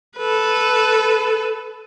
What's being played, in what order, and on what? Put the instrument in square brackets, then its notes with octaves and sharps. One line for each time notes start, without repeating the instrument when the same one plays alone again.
[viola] A4 B4